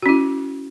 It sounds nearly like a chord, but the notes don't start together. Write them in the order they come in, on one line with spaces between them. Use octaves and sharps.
F#4 C#4 E4